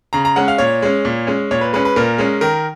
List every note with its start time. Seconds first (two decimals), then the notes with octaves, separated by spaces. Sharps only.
0.13 C#3 A#5
0.25 A#5
0.36 G#3 C#4 F#5
0.48 F5
0.58 A#2 C#5
0.82 G#3 C#4
1.05 A#2
1.27 G#3 C#4
1.51 A#2 C#5
1.61 B4
1.73 G#3 C#4 B4
1.85 B4
1.96 A#2 A#4
2.18 G#3 C#4
2.41 D#3 A#4